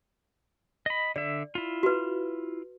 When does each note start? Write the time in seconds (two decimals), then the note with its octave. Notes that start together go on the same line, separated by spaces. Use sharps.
0.86 D#5 B5
1.16 D3 D5 E5
1.55 E4 F4
1.83 F#4 B4